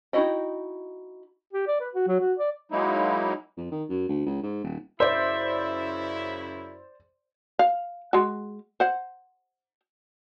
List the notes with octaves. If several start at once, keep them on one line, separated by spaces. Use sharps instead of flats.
D#4 E4 F#4 D#5 G5
G4
D5
B4
F#4
F#3
F#4
D5
F#3 G#3 A#3 D#4 E4
F2
D#3
F#2
D2
C#2
G#2
D#1
F#2 C#3 E4 C5 D5 E5
F5
G#3 F#4
C5 F#5